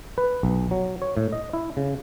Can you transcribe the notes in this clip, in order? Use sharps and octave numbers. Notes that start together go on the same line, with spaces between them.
B4
B1
F#3
C#5
A2
D#5
E4
C#3